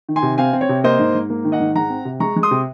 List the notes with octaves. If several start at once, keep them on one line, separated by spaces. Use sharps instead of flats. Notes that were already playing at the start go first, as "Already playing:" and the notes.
D#3
G#5 C6
C3
C4 F5 G#5
C4
C#5
C3
A#3 C5 D#5
G#2
G#2
A#3
D#3
D#5 F#5
G#2
G#3 F#5 A#5
C4
C3
G#3 A#5 C#6
G#3
C6 D#6
C3